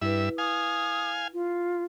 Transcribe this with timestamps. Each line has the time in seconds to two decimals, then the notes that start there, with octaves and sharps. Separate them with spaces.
0.01 G2 E4 B4 E5
0.38 F5 G#5 D#6
1.33 F4